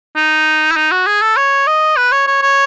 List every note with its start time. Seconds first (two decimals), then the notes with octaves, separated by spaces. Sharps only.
0.16 D#4
0.71 E4
0.76 D#4
0.91 F#4
1.07 G#4
1.21 A4
1.37 C#5
1.67 D#5
1.97 B4
2.12 C#5
2.27 C#5
2.42 C#5